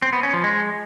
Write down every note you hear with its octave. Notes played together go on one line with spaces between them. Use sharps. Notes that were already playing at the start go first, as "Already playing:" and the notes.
C4
B3
C#4
F3
G#3